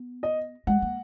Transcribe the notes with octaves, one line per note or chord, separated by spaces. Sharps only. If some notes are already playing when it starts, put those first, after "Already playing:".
Already playing: B3
D#5
G#3 F#5
A#3